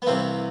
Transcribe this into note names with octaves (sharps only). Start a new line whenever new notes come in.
B3
C2 C3 E3 A#3 C4